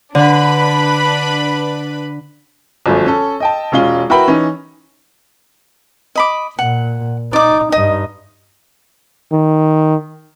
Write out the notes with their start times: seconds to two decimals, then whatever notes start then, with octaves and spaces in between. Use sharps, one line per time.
0.15 D3 D4 B4 B5
2.86 G1 F#2 F3 A3
3.06 C#4 A4
3.40 D#5 G5 A5
3.72 E1 G#3 C#4 F4 G7
4.10 E4 F#4 A#4 B4 G5 B5
4.28 E3 C#4 D#4
6.15 D#5 B5 D6
6.59 A#2 F#5
7.33 D#4 D5 D6
7.72 G2 D#4 D#5
9.32 D#3